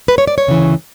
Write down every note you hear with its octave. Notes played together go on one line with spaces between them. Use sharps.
B4
C#5
D5
C#5
D2 C#3 E3